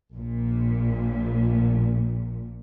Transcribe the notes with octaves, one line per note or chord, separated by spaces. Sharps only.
A#1 A#2